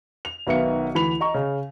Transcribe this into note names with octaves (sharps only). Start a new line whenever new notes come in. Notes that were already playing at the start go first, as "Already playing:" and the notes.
F7
B1 D#3 B3 E5 F5 C#7
D2 E3 B5 F7
D#5 A#5 C#6
C#3